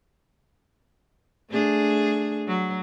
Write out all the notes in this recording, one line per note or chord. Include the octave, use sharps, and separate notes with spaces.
A3 D4 G#4
F#3